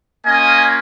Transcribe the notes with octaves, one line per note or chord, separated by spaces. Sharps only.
A#3 C#4 F4 D#5 G#5